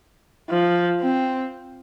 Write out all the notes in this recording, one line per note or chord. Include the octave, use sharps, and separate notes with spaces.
F3
C4